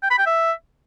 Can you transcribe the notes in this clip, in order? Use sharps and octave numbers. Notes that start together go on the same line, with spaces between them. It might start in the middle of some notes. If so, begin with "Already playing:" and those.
G5
B5
G5
E5